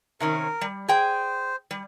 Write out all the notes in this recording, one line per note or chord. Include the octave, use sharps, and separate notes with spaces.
C3 D#3 C#4 A#4
G3
G#4 C5 G5
G3